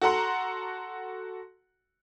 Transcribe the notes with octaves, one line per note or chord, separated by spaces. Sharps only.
F#4 A4 F#5 A#5 C6